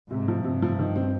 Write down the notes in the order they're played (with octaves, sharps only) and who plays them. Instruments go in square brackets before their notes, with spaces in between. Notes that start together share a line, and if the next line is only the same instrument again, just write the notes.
[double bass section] G#2 [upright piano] C3
[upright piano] F3
[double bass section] G2 [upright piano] C3
[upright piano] F3
D#3
C4